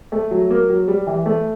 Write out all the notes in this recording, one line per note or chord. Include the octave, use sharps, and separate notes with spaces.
A3
F#3
A#3
F#3
G3
E3
A3